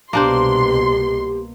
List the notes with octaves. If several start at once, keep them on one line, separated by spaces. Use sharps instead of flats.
C2 B2 A#3 D4 G4 C5 C6